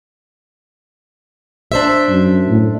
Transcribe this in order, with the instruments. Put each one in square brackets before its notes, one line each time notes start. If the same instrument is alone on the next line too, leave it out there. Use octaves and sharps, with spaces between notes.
[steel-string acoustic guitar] D4 C5 E5
[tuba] F#2
A2